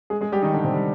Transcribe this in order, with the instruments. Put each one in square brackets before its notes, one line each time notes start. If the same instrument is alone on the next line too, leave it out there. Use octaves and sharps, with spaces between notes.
[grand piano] G#3 G#4
G#3 G#4
G3 G4
D#3 D#4
D3 D4
C3 C4
G3